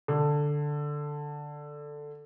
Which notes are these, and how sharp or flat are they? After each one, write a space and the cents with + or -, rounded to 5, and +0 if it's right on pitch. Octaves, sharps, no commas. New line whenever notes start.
D3 +5